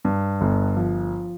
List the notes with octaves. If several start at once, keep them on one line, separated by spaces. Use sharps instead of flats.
G2
G1
F3